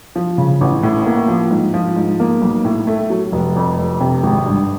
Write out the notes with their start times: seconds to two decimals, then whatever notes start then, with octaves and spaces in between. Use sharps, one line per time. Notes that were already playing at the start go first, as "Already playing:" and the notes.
0.16 F3
0.38 C#3
0.61 A1
0.83 A2
1.06 A#3
1.28 F3
1.51 G#2
1.74 F3
1.96 G#2
2.20 A#3
2.42 B1
2.65 A2
2.87 A3
3.10 F#3
3.32 F1
3.56 F2
3.78 F1
4.00 C3
4.23 G#1
4.46 G2